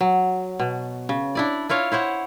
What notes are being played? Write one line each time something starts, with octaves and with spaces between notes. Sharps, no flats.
F#3
B2
C#3
D4 E4 D5
E4 F4 C#5 F5
E4 C5 C#5 F#5